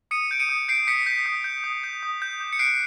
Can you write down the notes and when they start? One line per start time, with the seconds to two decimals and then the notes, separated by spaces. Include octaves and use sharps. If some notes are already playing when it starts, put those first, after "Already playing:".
0.11 D#6 C#7 D#7
0.31 G6 D7
0.40 C#7 D#7
0.49 D#6
0.68 G6 C7 D7
0.87 D#6 B6 C#7
1.06 G6 B6
1.26 D#6
1.44 G6
1.64 D#6
1.84 G6
2.03 D#6
2.22 G6
2.40 D6
2.53 C#7
2.59 F#6 C7 D7